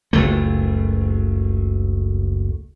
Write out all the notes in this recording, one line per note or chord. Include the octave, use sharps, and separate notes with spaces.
F#1 C#2 A3